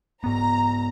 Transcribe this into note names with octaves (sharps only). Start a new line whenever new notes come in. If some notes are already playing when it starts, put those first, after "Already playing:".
G#2 B3 A#5